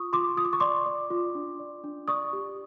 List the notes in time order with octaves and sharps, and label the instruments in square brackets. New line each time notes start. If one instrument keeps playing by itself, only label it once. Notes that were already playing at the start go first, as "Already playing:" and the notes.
Already playing: [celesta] F4 C#6 D#6
F4 C6 D6
F4 D#6
D6
C#6
D5 C6 D6
D5
F4
D4
D5
D4
D5 C#6 D#6
G4